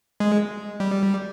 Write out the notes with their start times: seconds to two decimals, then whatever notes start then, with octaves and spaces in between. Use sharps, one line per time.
0.20 G#3
0.80 G3